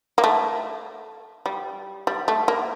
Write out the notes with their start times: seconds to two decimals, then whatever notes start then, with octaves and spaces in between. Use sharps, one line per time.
0.18 A#3
0.24 A3
1.46 G3
2.07 G3
2.28 A3
2.48 A#3